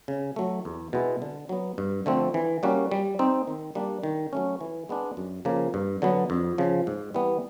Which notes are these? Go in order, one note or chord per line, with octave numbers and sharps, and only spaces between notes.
C#3
F#3 A3
E2
B2 G#3 B3 E4
D3
F#3 B3
G2
D3 F3 A3 C4
E3
G3 A#3 C#4 F#4
G3
C4 D#4
D#3
G3 A#3 D4
D#3
F#3 A3 C#4
E3
G#3 B3 D4
F#2
C#3 F3 A#3
G2
D3 F#3 B3
F2
C#3 F3
G#2
E3 G3 B3